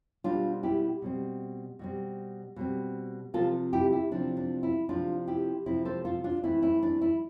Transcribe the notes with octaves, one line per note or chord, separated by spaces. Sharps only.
B2 G3 C4 D4 F4
E4 G4
B2 G3 C4
B2 G3 C4
B2 G3 C4
C3 F3 C4 F4 A4
E4 G4
E4
C3 F3 C4 D4
D4
E4
C3 F3 C4 D4 F4
E4 G4
C3 F3 C4 E4
A4 C5
F4 A4
D4 F4
E3 A3 C4 E4
E4
D4
E4